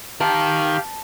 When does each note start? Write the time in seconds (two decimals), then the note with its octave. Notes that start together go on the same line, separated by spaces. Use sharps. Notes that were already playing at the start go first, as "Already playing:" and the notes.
0.20 D#3 G4 F5 A5